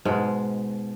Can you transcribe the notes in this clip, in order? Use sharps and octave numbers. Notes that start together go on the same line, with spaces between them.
G#2 B2 G#3